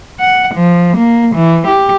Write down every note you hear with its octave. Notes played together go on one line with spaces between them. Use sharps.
F#5
F3
A#3
E3
G4